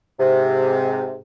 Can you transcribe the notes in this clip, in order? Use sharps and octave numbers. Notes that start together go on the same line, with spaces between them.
G#2 C3